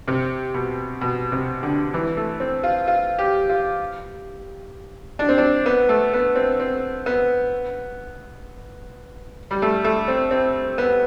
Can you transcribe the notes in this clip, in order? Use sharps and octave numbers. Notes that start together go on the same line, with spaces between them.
C3
B2
B2
C3
D3
E3
A3
C4
F4
F4
G4
F4
D4
C4
D4
B3
A3
B3
C4
C4
B3
G3
A3
A3
C4
C4
B3